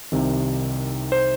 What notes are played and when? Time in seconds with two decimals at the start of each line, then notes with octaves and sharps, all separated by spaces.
0.12 C2 C3 D#3
1.12 C5